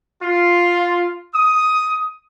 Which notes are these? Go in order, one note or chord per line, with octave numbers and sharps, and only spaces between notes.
F4
D#6